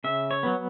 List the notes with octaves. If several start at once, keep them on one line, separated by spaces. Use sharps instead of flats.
C#3 E5
C#5
F#3 B3